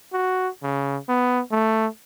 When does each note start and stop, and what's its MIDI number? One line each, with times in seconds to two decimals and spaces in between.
0.13 0.49 66
0.63 0.97 49
1.09 1.40 59
1.51 1.87 57